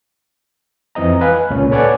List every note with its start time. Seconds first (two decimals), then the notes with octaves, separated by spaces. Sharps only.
0.95 F2 E3 C4 D#5 A#5
1.21 B4 F5 G#5
1.50 C#2 A#2 C#4
1.71 A4 B4 C#5 D5 F#5 G#5